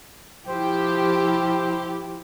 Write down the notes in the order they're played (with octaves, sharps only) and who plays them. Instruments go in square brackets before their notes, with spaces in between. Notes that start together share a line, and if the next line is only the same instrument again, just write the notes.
[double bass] F3 E4 [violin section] G4 [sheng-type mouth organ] C5